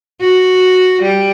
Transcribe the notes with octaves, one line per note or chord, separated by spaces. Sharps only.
F#4
G3